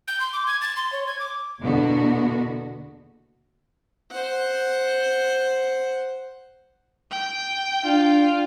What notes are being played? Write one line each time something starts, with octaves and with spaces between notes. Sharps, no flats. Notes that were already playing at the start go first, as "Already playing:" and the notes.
G6
C6
D6
G#6
A6
C6
C#5
G#6
D6
E2 B2 D3 A#3 B3 F#4
C5 F#5
G5
D4 F4